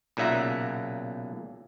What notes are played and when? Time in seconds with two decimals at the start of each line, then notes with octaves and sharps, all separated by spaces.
0.17 B1 A#2 C#3 E5 F#5 A#5